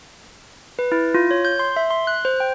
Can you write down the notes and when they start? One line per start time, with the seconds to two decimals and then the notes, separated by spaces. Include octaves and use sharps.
0.79 B4
0.92 E4
1.14 F4
1.31 C#5
1.45 G6
1.59 C6
1.76 E5
1.91 C6
2.07 F#6
2.25 C5
2.40 G5